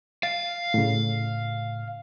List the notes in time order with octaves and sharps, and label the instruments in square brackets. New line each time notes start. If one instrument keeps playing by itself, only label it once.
[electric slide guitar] F5 [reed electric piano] A6
[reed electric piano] A2 C#3